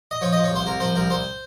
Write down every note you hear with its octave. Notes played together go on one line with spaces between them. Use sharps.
D#5
F3 C#5
F3 D#5
C#5
C2 C5
C2 A#4
F3 C5
C2 A#4
C2 C5